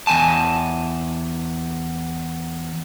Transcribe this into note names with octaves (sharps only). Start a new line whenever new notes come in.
E2 G#5 A5